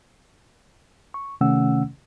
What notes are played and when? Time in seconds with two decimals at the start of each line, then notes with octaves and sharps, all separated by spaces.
1.14 C#6
1.41 C3 D#3 A3 C#4 F#5 E6